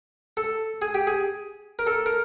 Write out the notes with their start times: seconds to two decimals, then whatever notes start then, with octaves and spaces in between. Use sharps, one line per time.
0.37 A4
0.82 G#4
0.94 G4
1.07 G#4
1.79 A#4
1.87 A4
2.06 A#4